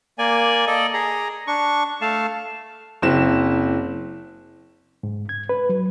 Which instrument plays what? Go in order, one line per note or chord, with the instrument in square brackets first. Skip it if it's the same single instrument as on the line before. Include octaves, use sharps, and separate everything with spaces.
[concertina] A#3 D5 G#5
A4 D5 D#5
G#4 A#5
D4 C#6
A3 F5 A5
[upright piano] F#1 C4 E4 E7
[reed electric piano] G#2
G#6
B4
F#3